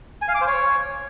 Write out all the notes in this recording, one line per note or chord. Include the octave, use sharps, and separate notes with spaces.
G#5
F5
D6
C5
C#5